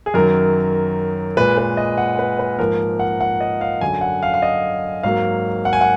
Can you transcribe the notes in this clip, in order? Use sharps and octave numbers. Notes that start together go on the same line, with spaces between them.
G#4
F#2 D#3 F#3 A#4
A#2 G#3 B4
B4
D#5
F#5
B4
B4
G#2 F3 A#3 A#4
F#5
F#5
D#5
F5
F#2 D3 F#3 G#5
F#5
F5
F5
D#5
G#2 F#3 A#3 F5
F#5
G#5
F#5